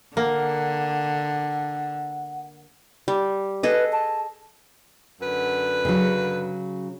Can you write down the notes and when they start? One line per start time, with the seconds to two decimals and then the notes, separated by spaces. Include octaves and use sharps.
0.17 D3 A#3 F#5
3.08 G3
3.63 G#4 A4 B4 D#5
3.93 A5
5.20 F#2 D3 B4
5.85 C#3 F#3